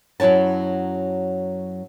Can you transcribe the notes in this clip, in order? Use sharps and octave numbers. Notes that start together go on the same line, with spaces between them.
F#2 F#3 E4 C#5 A5